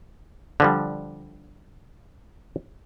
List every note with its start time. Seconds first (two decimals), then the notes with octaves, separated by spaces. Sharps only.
0.60 D3 F3 G3